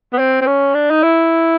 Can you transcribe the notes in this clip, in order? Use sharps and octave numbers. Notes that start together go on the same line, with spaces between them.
B3
C4
C4
C#4
D4
D#4
E4